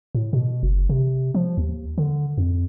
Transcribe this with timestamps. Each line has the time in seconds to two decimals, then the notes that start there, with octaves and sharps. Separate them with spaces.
0.15 A2
0.33 B2
0.63 F#1
0.89 C3
1.35 F3
1.58 D#2
1.98 D3
2.38 F2